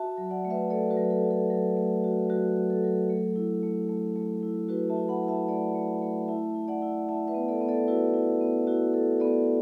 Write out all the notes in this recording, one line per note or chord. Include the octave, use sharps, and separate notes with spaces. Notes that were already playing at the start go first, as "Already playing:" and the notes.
Already playing: F#4 E5 A5
F#3
D5 F#5
A3
B4 E5
A3 A4 D5
F#4 B4
F#3
A4
F#3
A4
F#3 A4
A3
F#4
F#3 F#4
F#3
A4
F#3
A3
E4
A3
A3
A3
E4
E4 F#4 B4
E5 A5
E4
F#5 B5
E4
E5 A5
A3 D5 F#5
A3
A3
E4 E5 A5
E4
D5 F#5
E4
E4 E5 A5
B4 E5
B3
A4 D5
B3
A4 D5
E4 F#4 B4
E4
B3
E4 F#4
E4 A4
B3 A4 D5